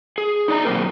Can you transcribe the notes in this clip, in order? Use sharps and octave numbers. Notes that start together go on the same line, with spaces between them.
G#4
D#4 D5 A#5
B2 F#3 G#3 A#3 C4 A#4